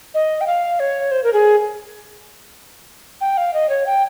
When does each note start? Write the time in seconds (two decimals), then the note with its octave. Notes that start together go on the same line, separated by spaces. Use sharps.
0.14 D#5
0.41 G5
0.47 F5
0.80 C#5
1.11 C5
1.24 A#4
1.33 G#4
3.21 G5
3.37 F5
3.54 D#5
3.69 C#5
3.86 G5